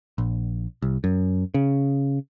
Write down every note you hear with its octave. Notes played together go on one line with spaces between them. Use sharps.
A#1
C2
F#2
C#3